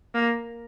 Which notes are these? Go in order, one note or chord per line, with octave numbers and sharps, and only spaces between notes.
A#3